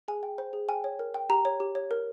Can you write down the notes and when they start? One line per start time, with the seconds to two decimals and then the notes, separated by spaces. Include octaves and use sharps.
0.08 G#4 G#5
0.23 G5
0.38 C5
0.53 G#4
0.68 G5 G#5
0.84 C#5
0.99 A#4
1.14 G5
1.29 G4 A#5
1.45 C#5
1.60 G4
1.75 C#5
1.91 A#4